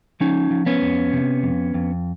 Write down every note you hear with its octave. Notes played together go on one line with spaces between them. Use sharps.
F3 C#4 D#4
F3
B3 C#4
F2
C3
F2
F2